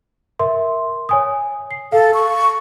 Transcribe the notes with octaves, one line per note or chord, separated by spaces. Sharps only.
A#4 E5 C6
C#5 G#5 D#6
C7
A4 F5
C#6